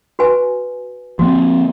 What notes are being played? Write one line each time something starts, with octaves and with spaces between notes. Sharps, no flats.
F#4 B4 G#5
F3 A#3 C4 F#4